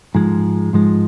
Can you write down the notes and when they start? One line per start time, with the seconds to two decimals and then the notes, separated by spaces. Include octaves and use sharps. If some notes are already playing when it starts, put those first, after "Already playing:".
0.15 G#2 F3 G#3
0.73 G#2 F3 G#3